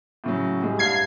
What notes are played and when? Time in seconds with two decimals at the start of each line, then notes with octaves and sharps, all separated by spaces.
0.24 A2 C#3 F#3
0.61 A2 G3 G#3
0.79 C2 G2 F5 G#6 C7